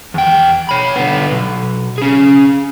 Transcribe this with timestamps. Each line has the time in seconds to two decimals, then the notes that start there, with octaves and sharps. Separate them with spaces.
0.14 E2 G5
0.69 C#5 B5
0.96 D3 B3
1.31 B1
1.98 C#4 G#4